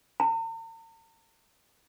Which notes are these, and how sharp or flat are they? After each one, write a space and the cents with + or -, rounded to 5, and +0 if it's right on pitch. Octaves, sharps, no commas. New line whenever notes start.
A#5 -45